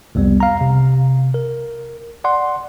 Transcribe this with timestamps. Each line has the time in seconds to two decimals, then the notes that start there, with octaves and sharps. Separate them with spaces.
0.15 C2 F2 G3 B3
0.40 F5 A#5
0.61 C3
1.34 A#4
2.24 D5 F#5 C6